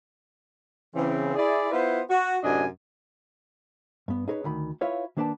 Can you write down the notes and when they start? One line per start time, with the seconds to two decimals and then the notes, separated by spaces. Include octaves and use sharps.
0.95 C#3 E3 C4
1.35 E4 G#4 D5
1.72 B3 E4 F4 B4 C5
2.10 F#4
2.44 F#2 A2 C3 D4 D#5 G#5
4.08 G2 B3
4.28 D#4 G#4 A#4 B4 C#5
4.44 D2 D#3 B5
4.81 E4 F4 B4 C#5 E5 F5
5.17 D#3 A#3 D4 B4 G5 A5